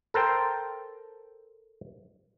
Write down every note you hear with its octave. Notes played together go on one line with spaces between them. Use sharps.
A4 A#4 C5 G5